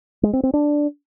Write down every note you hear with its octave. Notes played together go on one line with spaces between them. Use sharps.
G#3
C4
C4
D4